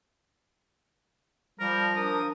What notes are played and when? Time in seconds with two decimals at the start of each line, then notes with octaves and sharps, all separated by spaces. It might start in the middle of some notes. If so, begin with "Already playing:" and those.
1.60 F3 G3 A#4
1.96 D4 A#4 D#6